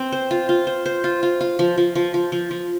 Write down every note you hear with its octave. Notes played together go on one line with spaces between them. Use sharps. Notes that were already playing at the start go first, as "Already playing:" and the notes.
Already playing: C4
C5
F4
F4
C5
C5
F4
F4
F4
F3
F3
F3
F3
F3
F3